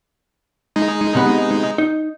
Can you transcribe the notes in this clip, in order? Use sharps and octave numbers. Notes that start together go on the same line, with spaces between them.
G#3 D#4
C3 B3 B5
D#4